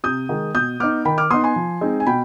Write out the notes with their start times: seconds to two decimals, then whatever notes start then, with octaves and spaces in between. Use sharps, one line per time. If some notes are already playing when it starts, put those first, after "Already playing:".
0.04 C3 D#6 G6
0.29 D#3 G#3
0.55 B2 D#6 G6
0.80 B3 D#4 D6 F6
1.05 D#3 G5 B5
1.18 D6 F6
1.30 B3 D#4 C6 D#6
1.44 G#5 C6
1.56 F3
1.81 G#3 C4 D#4
2.00 G#5
2.07 B2 G5 B5